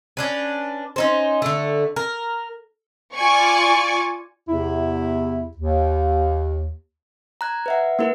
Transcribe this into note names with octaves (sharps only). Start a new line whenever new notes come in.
C#4 D4 B4
C#4 D#4 C5
D3 A3
A#4
F4 D5 G#5 C#6
E2 C3 E4
D#2
A#5 F#6 G#6
B4 E5 F#5
A#3 E4 A#4 B4